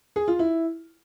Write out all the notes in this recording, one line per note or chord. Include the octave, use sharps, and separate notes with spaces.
G#4
F4
E4